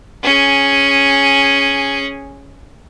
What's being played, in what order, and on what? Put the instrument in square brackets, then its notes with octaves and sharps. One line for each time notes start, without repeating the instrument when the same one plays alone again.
[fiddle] C#4 G#4